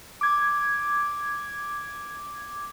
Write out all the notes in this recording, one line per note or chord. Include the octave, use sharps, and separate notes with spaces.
D6 G#6